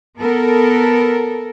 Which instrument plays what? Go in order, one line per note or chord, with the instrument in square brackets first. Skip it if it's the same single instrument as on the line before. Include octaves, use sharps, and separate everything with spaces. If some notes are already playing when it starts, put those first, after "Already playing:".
[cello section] B3 A4 A#4